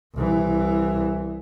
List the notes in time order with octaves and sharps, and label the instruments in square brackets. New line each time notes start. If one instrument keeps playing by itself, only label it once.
[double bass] C2 E3